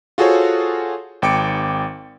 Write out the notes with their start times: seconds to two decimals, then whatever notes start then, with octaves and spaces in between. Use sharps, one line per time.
0.18 F4 F#4 G#4 A4 C5 C#5
1.22 G#1 G5 D6 C#7 D7